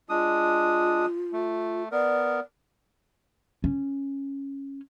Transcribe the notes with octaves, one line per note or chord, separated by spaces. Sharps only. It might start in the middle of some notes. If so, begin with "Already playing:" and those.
G#3 D4 F4 D#6
A3
B3 A#4 D5
C#4